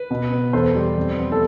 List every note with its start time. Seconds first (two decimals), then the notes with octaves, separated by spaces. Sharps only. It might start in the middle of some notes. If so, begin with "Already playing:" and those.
Already playing: B4
0.10 B2
0.32 B3
0.53 E2 A4 C5
0.75 G3
0.97 F2
1.18 B3
1.32 A4